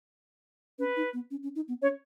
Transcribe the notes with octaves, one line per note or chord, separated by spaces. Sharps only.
C#4 B4
D#4
B3
C#4
C#4
D#4
B3
C#4 C#5